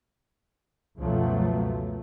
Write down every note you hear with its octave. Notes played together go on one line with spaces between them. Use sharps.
C#2 F#2 B2 F3 F#3 A3